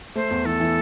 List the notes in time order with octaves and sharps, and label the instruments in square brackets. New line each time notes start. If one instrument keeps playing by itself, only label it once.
[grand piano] A3 [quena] C5
[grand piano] E2
[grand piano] E3 [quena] A4
[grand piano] E3